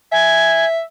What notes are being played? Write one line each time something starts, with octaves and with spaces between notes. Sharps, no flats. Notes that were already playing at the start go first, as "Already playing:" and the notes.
E5 G#5